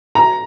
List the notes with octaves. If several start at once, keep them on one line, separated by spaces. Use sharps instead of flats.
A#5